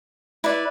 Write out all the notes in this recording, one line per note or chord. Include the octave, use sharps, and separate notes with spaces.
E4 B4 D5